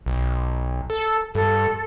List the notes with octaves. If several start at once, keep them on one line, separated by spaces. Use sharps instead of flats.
B1
A4
G2 A4